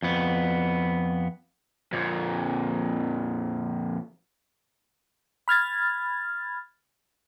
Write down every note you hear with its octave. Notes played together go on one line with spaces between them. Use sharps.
F2 B3
F2 A#2
B5 F6 G#6 A6